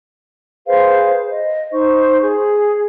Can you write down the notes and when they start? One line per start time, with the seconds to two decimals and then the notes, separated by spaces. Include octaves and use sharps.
0.67 G#4 B4 C5 F5
1.31 D#5
1.72 D#4 C5 C#6
2.21 G#4